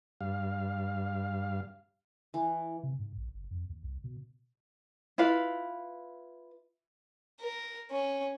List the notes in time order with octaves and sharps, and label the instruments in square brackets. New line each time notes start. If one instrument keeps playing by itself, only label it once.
[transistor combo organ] G2 F5
[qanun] E3
[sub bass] C3
G#2
A#1
F#1
F2
D#2
C2
B2
[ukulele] E4 F4 B4 F5
[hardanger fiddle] A#4
C#4